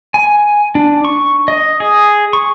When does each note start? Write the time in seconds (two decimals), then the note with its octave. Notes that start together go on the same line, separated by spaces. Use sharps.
0.14 G#5
0.75 D4
1.05 C#6
1.48 D#5
1.80 G#4
2.33 C#6